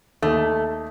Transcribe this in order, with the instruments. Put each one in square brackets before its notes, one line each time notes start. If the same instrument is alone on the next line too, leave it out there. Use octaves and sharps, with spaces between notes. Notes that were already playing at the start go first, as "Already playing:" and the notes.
[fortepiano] D#2 [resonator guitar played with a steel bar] A3